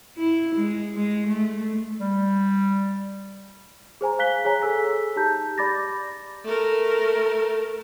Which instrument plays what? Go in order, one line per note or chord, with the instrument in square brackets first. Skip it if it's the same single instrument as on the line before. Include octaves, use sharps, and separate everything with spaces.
[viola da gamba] E4
G#3
G#3
A3
[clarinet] G3
[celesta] G#4 C5 G#5 A#5
F5 F#6 B6 G7
G#4 C#5 G#5 A#5
G#4 A4 E6 B6
D#4 G4 A5 A#5 G6
D5 B5 D6 A6 A#6
[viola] A3 A#4